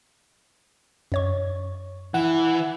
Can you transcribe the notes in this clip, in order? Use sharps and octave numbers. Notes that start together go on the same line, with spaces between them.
F#2 C#5 C#6
E3 E4 F#5